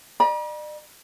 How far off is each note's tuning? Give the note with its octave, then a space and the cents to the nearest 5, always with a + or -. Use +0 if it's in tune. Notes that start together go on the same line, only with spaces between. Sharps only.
D5 +45 A#5 +45